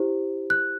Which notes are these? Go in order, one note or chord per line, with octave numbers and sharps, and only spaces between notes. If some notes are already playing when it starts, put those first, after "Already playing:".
Already playing: E4 G4 C5
F#6